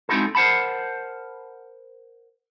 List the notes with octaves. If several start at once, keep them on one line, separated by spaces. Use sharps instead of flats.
G#3 C4 D#4 E4 F#4 A4
A#4 C5 F#5 A5 B5